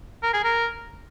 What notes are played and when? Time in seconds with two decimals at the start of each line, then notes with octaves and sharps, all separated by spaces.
0.22 A#4
0.33 G#4
0.44 A#4